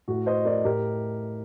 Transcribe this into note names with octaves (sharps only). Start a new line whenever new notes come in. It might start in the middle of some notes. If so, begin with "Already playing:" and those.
A2 F#4
C5 D#5
A#4 D5
A2 G4 A#4